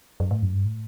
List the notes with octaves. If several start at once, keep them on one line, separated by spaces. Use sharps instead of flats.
F#2
A2
F#2
G2
A2